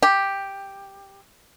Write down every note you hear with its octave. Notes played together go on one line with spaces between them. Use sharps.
G4